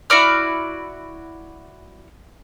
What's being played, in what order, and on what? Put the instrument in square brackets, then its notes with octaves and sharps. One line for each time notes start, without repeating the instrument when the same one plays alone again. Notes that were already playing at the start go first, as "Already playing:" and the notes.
[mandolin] E4 F#4 D5 F6